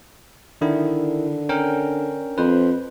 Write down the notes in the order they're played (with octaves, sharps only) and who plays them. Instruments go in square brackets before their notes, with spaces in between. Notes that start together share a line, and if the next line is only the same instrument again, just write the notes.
[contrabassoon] D3 [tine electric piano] D#3 E4
[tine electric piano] C#4 A#4 G5
[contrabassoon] F2 [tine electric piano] B4 C5